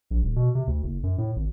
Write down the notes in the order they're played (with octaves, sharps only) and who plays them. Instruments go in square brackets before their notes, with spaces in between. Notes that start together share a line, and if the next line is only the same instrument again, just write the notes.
[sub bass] A#1
D#1
B2
C3
D2
F#1
F#2
A2
G#1